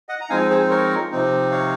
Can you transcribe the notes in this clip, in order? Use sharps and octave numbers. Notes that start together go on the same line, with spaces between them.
D#5 F#5
A#5
F3 G#3 C4 D#4 F5 G#5
G#4 C5
A#4 C#5
C3 F3 C4 D#4
C#5 F5